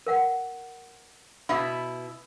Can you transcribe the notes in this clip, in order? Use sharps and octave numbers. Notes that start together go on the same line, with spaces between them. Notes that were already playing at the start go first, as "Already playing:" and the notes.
A#4 F5 F#5
B2 E4 F5 B5